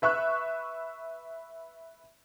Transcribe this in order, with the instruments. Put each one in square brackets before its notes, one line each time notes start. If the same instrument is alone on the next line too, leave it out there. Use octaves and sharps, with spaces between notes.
[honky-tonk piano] B4 E5 C#6 F#6